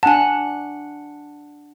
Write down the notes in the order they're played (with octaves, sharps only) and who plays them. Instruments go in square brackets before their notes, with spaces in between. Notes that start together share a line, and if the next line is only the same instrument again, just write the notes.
[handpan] D4 F#5 [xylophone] G#5 A5